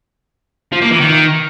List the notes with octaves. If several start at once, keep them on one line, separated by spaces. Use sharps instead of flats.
F3
A#3
E3
D#3